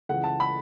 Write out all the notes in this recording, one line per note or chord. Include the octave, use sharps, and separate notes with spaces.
C#2 C#3 E3 F#5
A5
B5